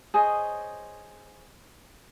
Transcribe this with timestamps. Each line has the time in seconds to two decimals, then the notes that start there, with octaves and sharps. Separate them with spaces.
0.14 G#4 C5 C#5 D#5